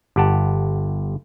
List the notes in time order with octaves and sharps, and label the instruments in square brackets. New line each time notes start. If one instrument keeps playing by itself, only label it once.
[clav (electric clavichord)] G1 G4 F#5 A5